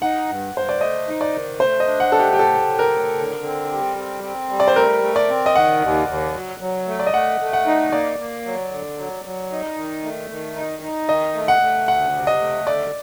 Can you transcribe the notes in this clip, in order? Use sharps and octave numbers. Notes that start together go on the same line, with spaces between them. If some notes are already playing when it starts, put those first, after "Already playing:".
D#4 F#5
G2
G2 C5
D5
A3 D#5
D#4
D5
D#3
A3 C5
D#5
D4
F#5
A3 A4
G4
G4
A2 A4
A2
A#4
A2
D3
C4
G3
C4
C4
G3
D5
C5
A3 A#4
A3
D5
C4
D#5
D#3 F#5
D#2
D#2
F#3
F#3
A3
D5
D#5
A3 F#5
A3
F#5
D#4
A#3 D5
A#3
F#3
D3
F#3
F#3
D#4
D#3
A3
D#3
D#4
D#4
D#3 D#5
A3
F#5
A3
D2 F#5
C3
D#5
A3
D3 D5